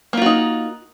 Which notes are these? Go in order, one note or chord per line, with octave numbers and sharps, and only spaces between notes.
A#3 D#4 F4 F#4